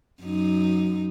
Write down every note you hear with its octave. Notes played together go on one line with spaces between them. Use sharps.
F#2 D#4